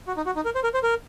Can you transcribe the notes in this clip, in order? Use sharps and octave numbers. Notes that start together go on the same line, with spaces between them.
F#4
D#4
F#4
D#4
A#4
C5
A#4
C5
A#4